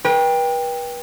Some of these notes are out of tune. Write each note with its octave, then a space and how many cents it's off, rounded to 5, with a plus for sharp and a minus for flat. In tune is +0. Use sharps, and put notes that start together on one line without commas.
B4 -35 G5 +20